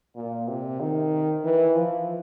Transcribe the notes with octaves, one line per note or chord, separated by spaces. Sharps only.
A#2
C3
D#3
E3
F3